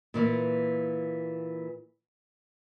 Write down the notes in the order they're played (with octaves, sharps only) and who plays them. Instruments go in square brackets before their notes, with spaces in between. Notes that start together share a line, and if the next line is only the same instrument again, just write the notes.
[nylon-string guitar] A#2 E3 A#3